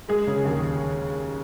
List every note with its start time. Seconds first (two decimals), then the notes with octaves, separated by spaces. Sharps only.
0.08 G#3 G#4
0.27 C#3
0.45 D#2